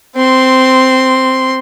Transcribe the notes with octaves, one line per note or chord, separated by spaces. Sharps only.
C4 C6